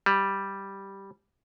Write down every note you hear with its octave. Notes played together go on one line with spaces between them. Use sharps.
G3